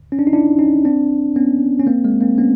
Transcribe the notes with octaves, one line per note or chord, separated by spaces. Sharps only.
C#4
D4
D#4
D4 E4
C#4 D#4
C4 D4
B3 C#4
C#4
A#3 C4
G#3 A#3
A#3 C4
B3 C#4